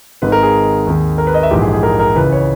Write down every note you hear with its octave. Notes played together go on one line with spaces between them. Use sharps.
G#1 G#2 D#3 B4
A#4
G#4
D#2 D#3
A#4
B4
D#5
E5
A#1 G#2 E3 G4
G#4
G#4
A#4
A#4
C#2 C#3 E3 B4
C#5